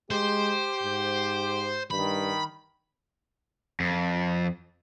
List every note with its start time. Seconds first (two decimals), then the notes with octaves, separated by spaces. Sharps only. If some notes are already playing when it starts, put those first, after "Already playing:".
0.11 G#3 G4 C5
0.83 G#2
1.90 G2 D#3 B5
3.80 F2